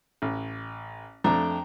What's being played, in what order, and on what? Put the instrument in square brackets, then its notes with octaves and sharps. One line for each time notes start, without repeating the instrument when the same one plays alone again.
[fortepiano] A1
[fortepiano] F2 A3 D4 [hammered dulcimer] G5 A#5